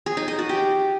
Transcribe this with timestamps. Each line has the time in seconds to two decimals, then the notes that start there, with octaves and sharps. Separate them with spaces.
0.06 G#4
0.17 D#4
0.28 D#5
0.39 F#4
0.49 G4